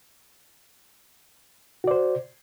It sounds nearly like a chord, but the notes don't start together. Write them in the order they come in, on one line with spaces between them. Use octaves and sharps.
F#4 D5 C5